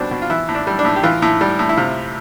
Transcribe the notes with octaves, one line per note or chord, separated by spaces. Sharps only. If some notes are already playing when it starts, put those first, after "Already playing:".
Already playing: B2 G3 C4 D4
B2
F4
E3 E4
A2
D4
G3
D4
A2
G4
E3 F4
A2
G3
A2
E4
C3 F4